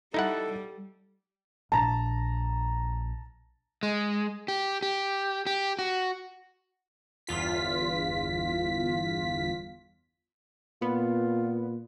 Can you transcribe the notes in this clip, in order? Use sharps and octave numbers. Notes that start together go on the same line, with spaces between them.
G3 D#4 E4 A4 F#5
A#1 A5 A#5
G#3
G4
G4
G4
F#4
G1 E2 F4 B6
A#2 B3 F4